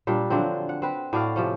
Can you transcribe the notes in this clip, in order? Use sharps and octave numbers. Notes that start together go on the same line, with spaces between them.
A#2 G3 D4
D3 F3 F#3 C4
F#5
C4 B4
A2 F#4 D5 F5
C3 F3 C#4